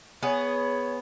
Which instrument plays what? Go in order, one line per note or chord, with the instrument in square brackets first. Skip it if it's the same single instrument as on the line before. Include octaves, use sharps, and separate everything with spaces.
[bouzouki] B3 G#4 [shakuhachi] C#5